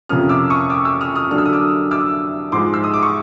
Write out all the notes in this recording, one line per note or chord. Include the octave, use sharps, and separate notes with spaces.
F2 C3 F3 A#3 C#4 D#6 F6
D6 E6
C#6 D#6
D6 E6
D6 E6
D#6 F6
D#6 F6
D3 F#3 A#3 D4 F6
E6
D#6
D6 E6
D6 E6
G#2 F3 G#3 C6 D6
E6
D#6
D6
C#6